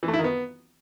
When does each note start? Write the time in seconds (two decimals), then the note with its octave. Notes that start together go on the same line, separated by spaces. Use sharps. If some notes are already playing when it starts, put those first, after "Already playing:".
0.03 E3
0.08 A3
0.13 E4
0.19 D#3
0.24 B3